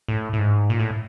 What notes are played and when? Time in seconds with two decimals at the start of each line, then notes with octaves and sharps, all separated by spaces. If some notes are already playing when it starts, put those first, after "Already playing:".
0.08 A2
0.33 A2
0.39 G#2
0.70 A#2
0.80 A2